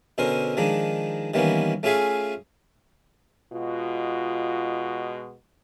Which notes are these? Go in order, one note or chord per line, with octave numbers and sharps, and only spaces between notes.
B2 D3 C#4 A#4 C5
D#3 F3 G#3 D4 D#4
D#3 E3 G3 A#3 B3 C#4
A3 C#4 F4 G#4 E5 F5
B2 G#3 F4 F#4